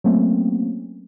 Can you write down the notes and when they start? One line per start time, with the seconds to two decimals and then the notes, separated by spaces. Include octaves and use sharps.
0.04 F#3 A3 A#3 C4 C#4